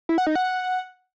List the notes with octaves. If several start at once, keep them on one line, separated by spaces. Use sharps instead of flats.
E4
F#5
D#4
F#5